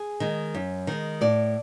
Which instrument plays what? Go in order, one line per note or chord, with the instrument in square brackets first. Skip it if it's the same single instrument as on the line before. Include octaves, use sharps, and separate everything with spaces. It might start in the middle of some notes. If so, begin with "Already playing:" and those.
Already playing: [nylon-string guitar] G#4
D#3 G#3
F#2
D#3 G#3
A2 D5